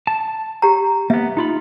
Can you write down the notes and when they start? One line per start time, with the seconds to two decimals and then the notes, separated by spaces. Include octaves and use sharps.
0.07 A5
0.62 G4 A#5
1.10 A#3 B3 E5
1.37 D#4 F4 B5